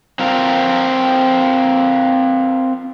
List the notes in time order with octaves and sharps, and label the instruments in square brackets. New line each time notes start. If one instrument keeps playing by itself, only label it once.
[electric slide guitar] C4 F4 A#4